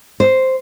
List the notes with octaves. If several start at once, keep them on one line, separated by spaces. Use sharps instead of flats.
C5